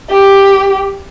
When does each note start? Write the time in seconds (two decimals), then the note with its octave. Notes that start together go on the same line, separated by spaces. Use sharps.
0.10 G4